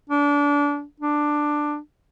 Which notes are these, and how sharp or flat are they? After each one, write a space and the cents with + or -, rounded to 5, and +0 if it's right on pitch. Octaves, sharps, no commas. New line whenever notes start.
D4 -25
D4 +10